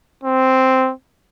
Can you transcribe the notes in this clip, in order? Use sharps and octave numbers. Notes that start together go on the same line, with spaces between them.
C4